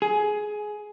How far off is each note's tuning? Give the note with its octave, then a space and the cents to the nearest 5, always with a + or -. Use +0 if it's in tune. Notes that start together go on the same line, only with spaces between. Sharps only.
G#4 +15